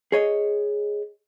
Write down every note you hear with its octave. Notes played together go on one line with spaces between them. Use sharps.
G#4 C#5 D#5